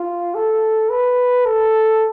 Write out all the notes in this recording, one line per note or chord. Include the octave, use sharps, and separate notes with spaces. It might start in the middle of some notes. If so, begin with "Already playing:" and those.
Already playing: F4
A4
B4
A4